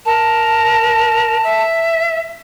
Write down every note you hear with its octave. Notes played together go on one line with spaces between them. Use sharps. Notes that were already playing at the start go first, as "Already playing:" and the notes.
A#4 A5
E5